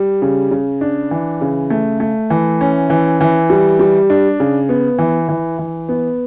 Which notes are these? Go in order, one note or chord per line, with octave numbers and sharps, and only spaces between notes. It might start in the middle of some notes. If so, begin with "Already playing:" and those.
Already playing: G3
C#3
C#3
D4
E3
C#3
A3
A3
E3
C#4
E3
E3
G3
G3
D4
C#3
B3
E3
E3
E3
B3